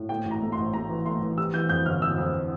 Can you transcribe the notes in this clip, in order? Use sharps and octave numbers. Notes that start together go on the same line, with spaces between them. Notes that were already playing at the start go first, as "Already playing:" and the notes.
Already playing: A2
A3 G5
A1
A#5
A3
C6
A1
A3 A#5
E3
A3 C6
E3
G3 E6
E3 G6
F2 G6
G1 F6
G1 E6
F2